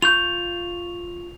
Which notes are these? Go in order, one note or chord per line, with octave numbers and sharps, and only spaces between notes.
F4 C#6 G6 F7